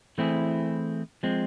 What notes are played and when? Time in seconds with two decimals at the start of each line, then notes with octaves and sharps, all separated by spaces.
0.18 E3 A3 C4 E4 G#4
1.23 F3 G#3 C4